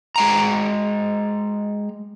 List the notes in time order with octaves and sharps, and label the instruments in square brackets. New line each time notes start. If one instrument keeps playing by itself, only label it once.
[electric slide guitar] G#3 G5 A#5